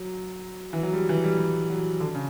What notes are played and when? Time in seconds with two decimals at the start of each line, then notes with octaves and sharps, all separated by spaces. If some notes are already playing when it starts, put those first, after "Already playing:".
Already playing: F#3
0.73 E3
0.83 F#3
0.93 G3
1.09 E3
1.24 G3
1.38 G3
1.70 F#3
2.00 D3
2.15 C#3